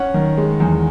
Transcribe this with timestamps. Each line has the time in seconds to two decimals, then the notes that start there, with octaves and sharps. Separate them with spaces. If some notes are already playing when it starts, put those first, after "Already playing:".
Already playing: C#4 F#5
0.14 D#3
0.37 G#3
0.60 E2